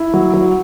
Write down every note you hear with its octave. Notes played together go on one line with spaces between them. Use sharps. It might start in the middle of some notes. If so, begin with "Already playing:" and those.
Already playing: E4
F#3
F#3